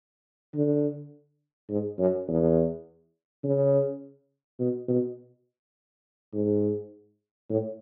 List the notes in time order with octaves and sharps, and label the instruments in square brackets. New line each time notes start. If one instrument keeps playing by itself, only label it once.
[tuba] D3
G#2
F#2
E2
C#3
B2
B2
G#2
A2